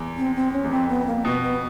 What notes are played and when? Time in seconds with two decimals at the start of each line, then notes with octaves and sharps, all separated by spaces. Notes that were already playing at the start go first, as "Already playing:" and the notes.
Already playing: E2
0.17 C4
0.36 C4
0.53 C#4
0.64 E2
0.71 F2 C4
0.89 B3
1.07 A#3
1.25 B2 B3
1.42 B3